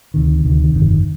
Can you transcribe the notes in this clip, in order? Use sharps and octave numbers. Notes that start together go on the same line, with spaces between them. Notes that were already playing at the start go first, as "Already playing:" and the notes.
D2 C3 D#3
D2 C3 D#3
G1 F2 D#3